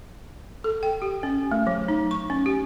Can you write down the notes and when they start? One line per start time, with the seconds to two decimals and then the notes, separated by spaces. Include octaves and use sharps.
0.64 A4
0.83 G5
1.02 G4
1.23 C#4
1.52 A3
1.67 F#3
1.88 D#4
2.11 C#6
2.30 C#4
2.46 G4